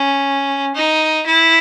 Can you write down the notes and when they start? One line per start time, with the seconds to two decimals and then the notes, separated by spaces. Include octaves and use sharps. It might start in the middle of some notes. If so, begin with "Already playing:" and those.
Already playing: C#4
0.75 D#4
1.26 E4